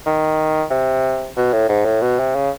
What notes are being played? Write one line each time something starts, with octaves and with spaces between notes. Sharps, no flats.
D#3
C3
B2
A2
G#2
A2
B2
C3
C#3